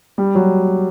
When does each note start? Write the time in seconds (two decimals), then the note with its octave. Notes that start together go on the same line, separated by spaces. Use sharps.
0.18 G3
0.35 F#3